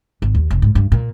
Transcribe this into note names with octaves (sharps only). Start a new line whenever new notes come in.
G#1
D#2
F1
G#2
G2
A#2